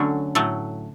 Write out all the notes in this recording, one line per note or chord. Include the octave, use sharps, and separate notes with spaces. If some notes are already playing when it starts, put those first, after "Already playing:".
Already playing: D3 F#3 A3 C#4
A2 F#3 A3